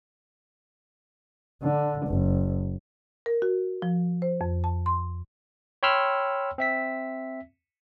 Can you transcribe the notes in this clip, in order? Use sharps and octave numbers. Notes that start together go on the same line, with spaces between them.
D3
F#1
A#4
F#4
F3
C5
F2
A5
C6
C#5 G5 B5 C6 E6 F6
C4 E5 B6